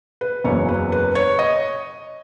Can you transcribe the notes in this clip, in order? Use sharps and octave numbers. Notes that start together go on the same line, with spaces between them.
B4
F#1 E2 C#3 F#3 C#5
B4
B4
C#5
D#5